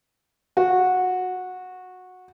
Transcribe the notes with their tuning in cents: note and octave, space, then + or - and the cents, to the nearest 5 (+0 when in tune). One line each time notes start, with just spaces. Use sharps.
F#4 -15